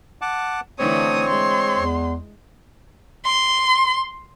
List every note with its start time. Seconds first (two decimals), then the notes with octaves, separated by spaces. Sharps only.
0.21 F#5 A5 D6
0.79 D3 E3 A3 C4 C#5 D#6
1.29 G#3 C6
1.75 E2
3.26 C6